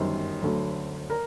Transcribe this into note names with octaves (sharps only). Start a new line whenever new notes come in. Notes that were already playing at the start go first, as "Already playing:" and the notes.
Already playing: G1 F#2 D#3 G3 C5 C6
D2 D3 F#3
A#4 A#5